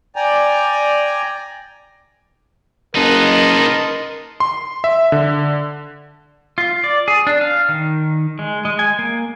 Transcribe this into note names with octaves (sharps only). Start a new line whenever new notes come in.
D5 G5 G#5 A#5
F#1 D#4 A#4 B4 D#5 A5 C6
C6
E5
D3
F4
D5
G#4
D4
F5
D#3
G#3
G#3
G#5
A#3